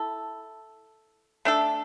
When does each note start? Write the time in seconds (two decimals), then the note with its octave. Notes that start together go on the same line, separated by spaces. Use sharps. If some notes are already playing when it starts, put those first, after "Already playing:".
Already playing: E4 A4
1.45 A3 D4 A4